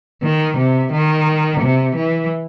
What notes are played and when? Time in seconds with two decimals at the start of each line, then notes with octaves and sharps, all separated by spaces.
0.23 D#3
0.57 C3
0.92 D#3
1.60 C3
1.95 E3